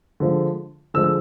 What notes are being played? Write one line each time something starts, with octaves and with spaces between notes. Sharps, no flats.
D3 F3 G#3
D3 F3 G#3 E6
E6